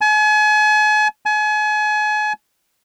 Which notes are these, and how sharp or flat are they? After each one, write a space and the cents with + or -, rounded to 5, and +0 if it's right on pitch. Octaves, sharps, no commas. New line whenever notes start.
G#5 +40
G#5 +35